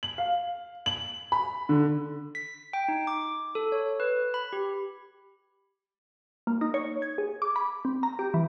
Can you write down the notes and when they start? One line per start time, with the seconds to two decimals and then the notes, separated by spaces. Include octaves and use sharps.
0.03 F#7
0.18 F5
0.86 F#7
1.32 B5
1.69 D3
2.35 B6
2.73 G5
2.88 D#4
3.07 D6
3.55 A4
3.72 C#5
4.00 B4
4.34 B5
4.53 G4
6.47 A#3
6.61 D#4
6.74 C#5
7.02 G#6
7.18 G#4
7.42 D6
7.56 B5
7.85 C4
8.03 A#5
8.19 G4
8.34 E3